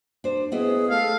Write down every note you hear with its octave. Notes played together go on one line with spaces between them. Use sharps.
D4 C5
B3 E4 G#4 D#5
A3 F5